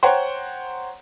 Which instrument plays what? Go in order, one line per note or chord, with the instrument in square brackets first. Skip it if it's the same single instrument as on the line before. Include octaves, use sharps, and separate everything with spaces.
[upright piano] C5 C#5 F#5 G5 A#5